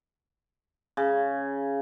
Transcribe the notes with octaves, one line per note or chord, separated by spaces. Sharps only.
C#3